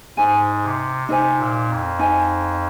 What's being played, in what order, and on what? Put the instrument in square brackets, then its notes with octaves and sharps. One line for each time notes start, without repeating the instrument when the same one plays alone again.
[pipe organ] G#2 [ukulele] D#4 C5 G#5
[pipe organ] C3
[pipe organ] C3 [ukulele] D#4 C5 G#5
[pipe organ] A#2
F2
[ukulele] D#4 C5 G#5